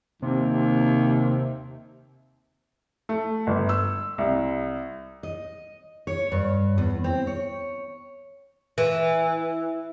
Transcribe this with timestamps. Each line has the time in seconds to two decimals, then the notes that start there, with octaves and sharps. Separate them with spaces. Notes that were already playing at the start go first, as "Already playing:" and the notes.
0.22 D#2 C3
3.09 A3
3.47 G1
3.69 E6
4.18 C2
5.23 D#5
6.07 C#5
6.32 G2
6.78 E2
7.04 C4
7.27 C#5
8.78 E3